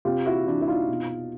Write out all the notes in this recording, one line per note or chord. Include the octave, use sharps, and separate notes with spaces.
C3 F4 G4
E4 F#4
E3 D4 E4
E4
D#4 F4
B2